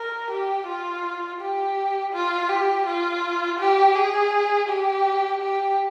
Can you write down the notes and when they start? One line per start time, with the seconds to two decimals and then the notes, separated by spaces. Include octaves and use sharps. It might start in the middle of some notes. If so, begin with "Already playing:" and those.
Already playing: A#4
0.30 G4
0.66 F4
1.40 G4
2.13 F4
2.49 G4
2.86 F4
3.59 G4
3.96 G#4
4.69 G4
5.42 G4